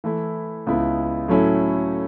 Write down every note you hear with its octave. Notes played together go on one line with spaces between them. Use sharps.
E3 A3 E4
C#2 C#3 G#3 B3 E4
A2 F#3 A3 C#4 E4